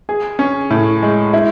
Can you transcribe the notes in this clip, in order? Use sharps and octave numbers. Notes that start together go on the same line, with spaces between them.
G#4
C#4
A2
G#3
E4